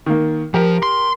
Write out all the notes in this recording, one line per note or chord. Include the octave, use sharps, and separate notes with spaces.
D#3 A#3
F3 G4 A#4
C6